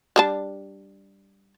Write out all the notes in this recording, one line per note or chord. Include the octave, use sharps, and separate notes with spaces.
G3 D4 A5